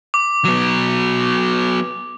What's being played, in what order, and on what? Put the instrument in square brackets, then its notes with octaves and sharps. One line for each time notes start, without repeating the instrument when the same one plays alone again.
[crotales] D6
[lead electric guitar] F#3 B3